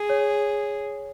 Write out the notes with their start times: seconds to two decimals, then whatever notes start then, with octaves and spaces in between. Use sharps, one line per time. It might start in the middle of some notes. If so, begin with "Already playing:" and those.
Already playing: G#4
0.09 C#5